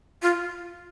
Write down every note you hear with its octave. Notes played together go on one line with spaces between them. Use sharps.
F4